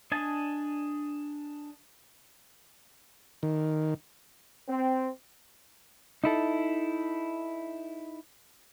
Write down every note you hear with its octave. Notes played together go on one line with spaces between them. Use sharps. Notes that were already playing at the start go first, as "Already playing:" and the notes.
D4 D#5 G#5 A5
D#3
C4
D#4 E4 A4